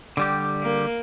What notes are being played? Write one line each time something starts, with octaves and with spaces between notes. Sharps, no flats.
D3 G3 G4
A#3